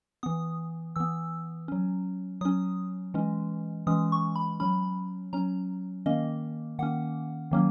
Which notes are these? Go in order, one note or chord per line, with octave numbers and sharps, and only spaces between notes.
E3 B3 D#6
E3 B3 E6
F#3 C#4
F#3 C#4 D#6
E3 G#3 C#4
E3 G#3 C#4 D#6
C#6
B5
F#3 C#4 B5
F#3 C#4 A#5
D#3 A#3 C#4 D#5
D#3 A#3 C#4 F#5
D#3 F#3 A#3 C#4